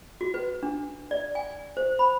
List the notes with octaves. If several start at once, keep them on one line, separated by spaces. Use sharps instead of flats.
F#4
B4
D4
D5
G#5
C5
B5